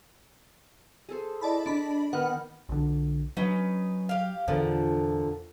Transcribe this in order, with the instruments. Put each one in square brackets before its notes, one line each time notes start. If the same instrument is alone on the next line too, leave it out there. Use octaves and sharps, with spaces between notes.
[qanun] G#4 A4 C5
[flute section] E4 D#5 [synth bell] D5 A5 B5
[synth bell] D4 B5 [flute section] D#5
[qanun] D#3 [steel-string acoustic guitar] B3 [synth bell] F#5 [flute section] B5 F6
[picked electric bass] B1 D3
[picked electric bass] F#3 [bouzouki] C#4 D#4 B4
[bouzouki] G4 F5
[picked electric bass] E2 [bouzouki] A#2 D3 F3